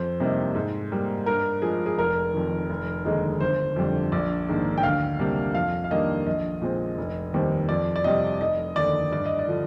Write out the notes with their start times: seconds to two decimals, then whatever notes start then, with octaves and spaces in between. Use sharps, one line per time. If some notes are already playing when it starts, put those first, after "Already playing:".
Already playing: F2 C5
0.20 C3 G3 A#3 D#4
0.55 G#2
0.92 G3 A#3
1.26 G2 A#4
1.62 F3 G#3 G#4
1.86 G#4
1.98 F1 A#4
2.34 F2 D#3
2.70 F1
3.05 D#2 D3 G#3 D#4
3.40 G1 C5
3.76 F2 D3 G3 D4
4.12 A#1 D5
4.49 G#2 D#3 A#3 D4
4.78 G5
4.83 D2 F5
5.19 C3 G3 A#3 D4
5.55 F2 F5
5.84 F5
5.91 D#3 G3 A#3 D4 D#5
6.27 A#1 D#5
6.62 A#2 G#3 C4
6.98 F1
7.33 D#2 D#3 G3 C4
7.69 F2 D5
7.96 D5
8.04 C3 G3 D#5
8.40 F1 D#5
8.76 D#2 D3 D5
9.12 G2 D5
9.25 D#5
9.39 D5
9.48 D3 F3